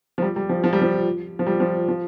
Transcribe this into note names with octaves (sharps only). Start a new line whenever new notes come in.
F3
G3
G3
F3
F3
G3
F3
F3
G3
F3
F3